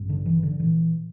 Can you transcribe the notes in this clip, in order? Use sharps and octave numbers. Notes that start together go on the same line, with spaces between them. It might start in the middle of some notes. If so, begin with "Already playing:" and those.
Already playing: A1 G2
D3
E3
D3
A#2 E3